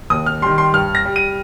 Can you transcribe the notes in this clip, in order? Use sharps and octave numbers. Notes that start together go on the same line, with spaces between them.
D#2 D#6
F6
D#3 G3 C6
C6
G2 F6
A#6
G3
D#7